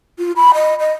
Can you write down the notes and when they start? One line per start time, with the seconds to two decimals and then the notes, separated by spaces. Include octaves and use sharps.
0.19 F4
0.36 B5
0.54 D#5
0.80 D#5